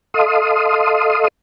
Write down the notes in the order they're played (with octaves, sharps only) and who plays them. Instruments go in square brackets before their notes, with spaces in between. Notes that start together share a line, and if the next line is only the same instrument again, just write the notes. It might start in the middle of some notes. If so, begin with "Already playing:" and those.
[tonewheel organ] A4 D#5 F5 C6 D#6